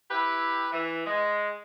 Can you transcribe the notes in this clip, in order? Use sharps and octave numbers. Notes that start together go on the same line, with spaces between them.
E4 G4 B4
E3
G#3